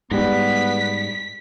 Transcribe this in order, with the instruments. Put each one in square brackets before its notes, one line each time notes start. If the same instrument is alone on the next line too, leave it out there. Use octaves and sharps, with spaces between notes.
[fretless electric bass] G#2 G3 [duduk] B3 [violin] B6